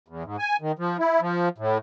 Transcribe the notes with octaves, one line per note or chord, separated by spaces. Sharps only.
E2
G#2
G#5
D#3
F3
E4
F3
A2